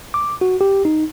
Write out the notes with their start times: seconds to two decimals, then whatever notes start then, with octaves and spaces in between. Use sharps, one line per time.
0.14 D6
0.41 F#4
0.61 G4
0.85 D#4